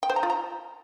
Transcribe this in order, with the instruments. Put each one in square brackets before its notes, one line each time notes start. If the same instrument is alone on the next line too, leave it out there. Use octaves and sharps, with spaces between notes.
[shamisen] G5
C5
A#5
F4
A#5